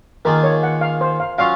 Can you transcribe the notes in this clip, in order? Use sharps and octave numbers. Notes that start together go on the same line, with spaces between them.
D#3 A#3 F4 G#4 A#4
C#5
F#5
F5
C5
F5
F#3 C#4 F4 F5